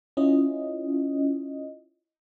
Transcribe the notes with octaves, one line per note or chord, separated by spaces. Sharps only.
C#4 E4 F4 D#5